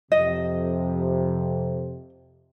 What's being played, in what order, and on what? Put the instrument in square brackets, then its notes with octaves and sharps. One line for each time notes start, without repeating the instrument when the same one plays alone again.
[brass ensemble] F2 C3 [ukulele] D#5